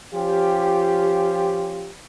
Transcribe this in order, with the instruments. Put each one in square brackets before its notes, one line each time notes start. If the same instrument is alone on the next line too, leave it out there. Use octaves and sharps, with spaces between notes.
[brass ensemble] F3 C#4 F4 G4